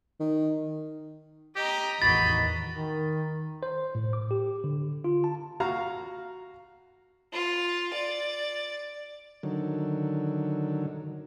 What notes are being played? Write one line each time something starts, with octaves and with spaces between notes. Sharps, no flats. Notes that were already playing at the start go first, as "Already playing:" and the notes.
D#3
G4 D#5 A#5
A1 E2 D#3 F#4 D#5 B5 A6
D#3
C5
A2
D6
G4
D3
F4
A5
F#4 F5 A#5 F6
F4
D5
D3 D#3 F#3